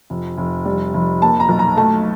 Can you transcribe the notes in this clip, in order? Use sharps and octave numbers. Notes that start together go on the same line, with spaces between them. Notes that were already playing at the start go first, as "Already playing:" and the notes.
F1
F1
G3
F1
A#3 A5
A#5
B1
A#5
A3 A5